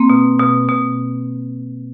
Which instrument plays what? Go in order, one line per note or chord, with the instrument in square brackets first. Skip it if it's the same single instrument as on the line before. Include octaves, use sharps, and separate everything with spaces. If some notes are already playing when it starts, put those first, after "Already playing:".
Already playing: [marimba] A#3 C4
B2
B2
B2